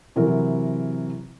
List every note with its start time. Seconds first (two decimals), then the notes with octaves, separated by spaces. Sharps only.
0.16 C3 E3 F#3 A#4